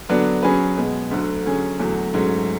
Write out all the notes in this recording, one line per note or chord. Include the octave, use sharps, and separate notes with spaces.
D3 F#3 B3 D4
F#3 C#4 G#4 B4
B2 G#3 B3
D2 D3 F#3
D3 F#3 C#4 G#4
E2 D3 F#3 A3
G#2 F#3 A3 C#4